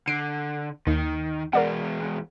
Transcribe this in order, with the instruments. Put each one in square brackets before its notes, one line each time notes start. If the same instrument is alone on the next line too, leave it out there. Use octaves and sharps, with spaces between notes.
[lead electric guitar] D3 [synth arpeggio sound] C7 D7
[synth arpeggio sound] D#2 [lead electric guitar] D#3
[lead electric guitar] E2 G#3 [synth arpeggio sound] A#4 D5 F#5